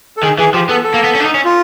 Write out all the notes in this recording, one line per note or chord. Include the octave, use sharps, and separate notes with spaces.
A4
D#3 G#4
E3 G#4
F3 G4
B3 A4
A4
A#3
B3
C#4
D4
D#4
C#4
F4